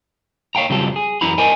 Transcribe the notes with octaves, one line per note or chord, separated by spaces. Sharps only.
C#5 F5 G5 A#5
C#3 F#3 G3 C4 F4 A4
G#4
F#2 E3 E4 F#4 A#5 B5
A#4 C5 D5 D#5 G#5